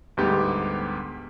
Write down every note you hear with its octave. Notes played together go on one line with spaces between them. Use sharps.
D2 G#2 G3 B3 G4 G6